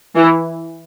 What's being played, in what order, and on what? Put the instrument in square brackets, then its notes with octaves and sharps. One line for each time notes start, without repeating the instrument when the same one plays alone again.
[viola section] E3